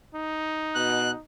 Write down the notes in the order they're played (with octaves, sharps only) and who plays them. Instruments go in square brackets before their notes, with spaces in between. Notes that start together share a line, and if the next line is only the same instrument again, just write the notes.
[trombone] D#4
[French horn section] B2 [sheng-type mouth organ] F#6